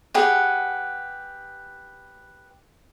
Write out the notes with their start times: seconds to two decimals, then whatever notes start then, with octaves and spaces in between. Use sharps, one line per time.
0.14 G4 G#4 B4 F#5